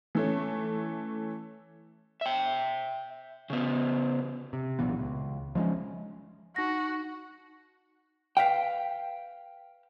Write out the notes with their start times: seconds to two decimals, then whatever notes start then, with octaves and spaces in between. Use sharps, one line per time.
0.15 E3 A3 C#4
2.21 E5 G5
3.50 C#3 B3
4.53 C3
4.79 B1 A#2 E3 B3
4.99 C#2
5.55 F3 G#3 C4 C#4
6.56 D#4 F#4 A#6
8.37 B4 E5 F5 G5